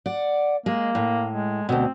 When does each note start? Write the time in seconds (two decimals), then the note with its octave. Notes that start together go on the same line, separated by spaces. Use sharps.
0.06 D5 F#5
0.66 G#3 A#3
0.95 A2
1.31 G#3
1.69 D2 B2 C4